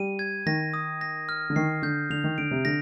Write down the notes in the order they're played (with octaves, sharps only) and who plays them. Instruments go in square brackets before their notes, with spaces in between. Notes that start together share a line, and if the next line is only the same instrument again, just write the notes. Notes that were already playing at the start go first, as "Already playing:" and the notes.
Already playing: [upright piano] G3 [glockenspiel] D#7
[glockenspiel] G#6
[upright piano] D#3 [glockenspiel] A#6
[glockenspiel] D#6
A#6
F6
[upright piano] D3
[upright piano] D#3 [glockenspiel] C7
[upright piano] D3 [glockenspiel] G6
[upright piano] D3 [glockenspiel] F7
[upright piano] D#3
[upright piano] D3 [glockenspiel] D7
[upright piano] C3
[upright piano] D3 [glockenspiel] A#6